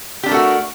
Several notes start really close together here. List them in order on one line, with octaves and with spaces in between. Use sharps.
G4 D4 A#4 A3 F#4